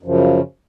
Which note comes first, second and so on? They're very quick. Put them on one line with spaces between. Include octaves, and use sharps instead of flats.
F#2 F3 C#3